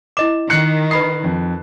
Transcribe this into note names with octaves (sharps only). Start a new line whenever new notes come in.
E4 D#5 D6 E7
D#3 F#6 C7 C#7
B4 B5 D#6 C7
F2